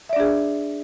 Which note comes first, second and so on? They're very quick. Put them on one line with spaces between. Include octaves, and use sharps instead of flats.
E5 D5 D4 G#4